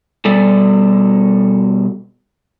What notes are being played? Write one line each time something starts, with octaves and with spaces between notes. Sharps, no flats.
B2 G3 A4 D5